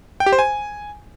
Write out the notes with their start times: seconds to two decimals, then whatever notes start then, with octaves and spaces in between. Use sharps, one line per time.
0.20 G5
0.26 G4
0.33 C5
0.39 G#5